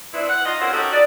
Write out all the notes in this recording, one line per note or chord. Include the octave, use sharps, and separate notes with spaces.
B3 C4 D4 E4
F#5
D#4 F4 D#5
A#3 C4 C#4 F4 F#4
C#4 D#4 F#4 G4 A4
D#4 D5